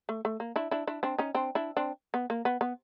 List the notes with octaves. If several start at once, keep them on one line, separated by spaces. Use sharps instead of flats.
A3
A3
A#3
D4 E4
D4 E4
D4 E4
C4 D4
C#4 D#4
C4 D4
D4 E4
C4 D4
B3
A#3
B3
B3